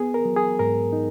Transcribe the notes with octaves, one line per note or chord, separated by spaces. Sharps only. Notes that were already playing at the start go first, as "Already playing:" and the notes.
Already playing: B3 G#4
A#4
F#3
G#4
G#2 A#4
D#4